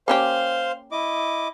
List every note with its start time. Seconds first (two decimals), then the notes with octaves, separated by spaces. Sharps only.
0.08 A#3 C#4 G4 C5 F5 C6
0.92 E4 D#5 D6